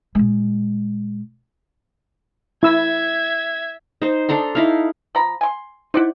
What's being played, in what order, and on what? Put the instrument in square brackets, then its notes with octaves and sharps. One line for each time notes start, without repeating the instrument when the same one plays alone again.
[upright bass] A#2 G#3
[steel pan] E4 E6 [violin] E5 G#6
[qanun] D#4 C5
D4 A4 A#5 C6
D#4 E4 F5
[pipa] F3 A#5 B5
G#5 C6
[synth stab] D#4 E4 [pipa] C5 D5 F#5